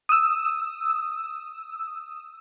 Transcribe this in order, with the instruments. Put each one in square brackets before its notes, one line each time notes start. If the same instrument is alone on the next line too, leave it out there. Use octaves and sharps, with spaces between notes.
[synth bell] D#6 E6